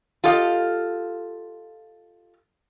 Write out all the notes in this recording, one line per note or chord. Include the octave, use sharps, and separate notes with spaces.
F4 G4 A4 D#5 F5